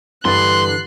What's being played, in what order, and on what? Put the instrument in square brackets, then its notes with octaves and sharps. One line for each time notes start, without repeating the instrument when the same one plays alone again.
[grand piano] G2 B4 A6 [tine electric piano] D3 E3 [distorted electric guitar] C6 [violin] F#6 C7